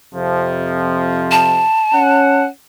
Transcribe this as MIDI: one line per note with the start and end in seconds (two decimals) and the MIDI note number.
0.14 1.65 41
0.14 1.65 48
0.14 1.65 53
1.31 2.44 81
1.94 2.48 61
1.94 2.48 78